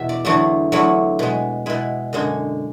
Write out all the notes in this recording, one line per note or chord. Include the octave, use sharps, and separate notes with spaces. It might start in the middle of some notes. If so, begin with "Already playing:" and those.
Already playing: E2 B2 E5
D5
E2 D3 F#3 A3
E2 D3 F#3 A3 E4
B2 G#3
B2 G#3 E4
F#2 D3 G#3